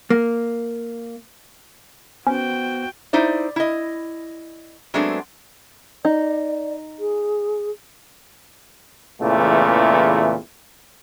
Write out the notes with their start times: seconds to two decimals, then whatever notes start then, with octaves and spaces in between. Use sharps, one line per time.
0.10 A#3
2.27 B3 C#4 F#4 C5 G5
3.13 D#4 E4 C5 D5
3.56 E4 D#5
4.94 F#3 G#3 A3 B3 C4 D4
6.05 D#4 D5
6.99 G#4
9.21 E2 A#2 C#3 E3 A3